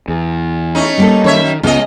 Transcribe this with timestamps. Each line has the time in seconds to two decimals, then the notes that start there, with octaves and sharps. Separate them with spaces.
0.08 E2
0.75 A3 C#4 D#4
0.98 G3 A#3 A4
1.24 F#2 D#3 C#5 E5
1.63 C#2 C#3 G#3 B3 F4 D#5